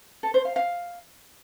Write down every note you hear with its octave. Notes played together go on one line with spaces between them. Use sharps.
A4
C5
F5
F5